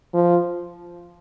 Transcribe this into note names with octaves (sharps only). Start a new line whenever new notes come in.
F3